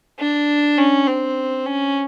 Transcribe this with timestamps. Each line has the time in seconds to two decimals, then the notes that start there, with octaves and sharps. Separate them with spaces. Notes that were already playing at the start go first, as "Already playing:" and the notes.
0.19 D4
0.77 C#4
1.07 C4
1.66 C#4